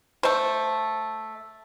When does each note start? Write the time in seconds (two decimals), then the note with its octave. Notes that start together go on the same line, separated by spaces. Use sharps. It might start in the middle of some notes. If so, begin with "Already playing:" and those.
0.23 A3 C5